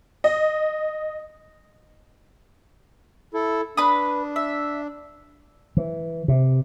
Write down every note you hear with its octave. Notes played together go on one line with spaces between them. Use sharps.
D#5
E4 A4
D4 B4 D#6
E5
E3
C3